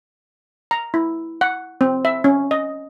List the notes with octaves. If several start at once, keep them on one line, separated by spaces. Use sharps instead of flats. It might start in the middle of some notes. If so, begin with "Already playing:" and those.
A#5
E4
F#5
C4
E5
C#4
D#5